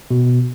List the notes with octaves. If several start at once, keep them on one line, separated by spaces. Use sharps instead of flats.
B2